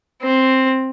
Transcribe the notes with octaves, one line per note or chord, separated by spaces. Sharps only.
C4